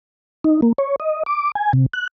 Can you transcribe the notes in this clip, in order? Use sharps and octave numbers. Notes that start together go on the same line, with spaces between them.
D#4
A#3
C#5
D#5
D6
G#5
C3
F#6